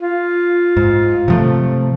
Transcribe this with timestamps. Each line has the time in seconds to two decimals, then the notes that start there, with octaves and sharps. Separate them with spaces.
0.01 F4
0.77 G#2
1.28 C3 F3 A3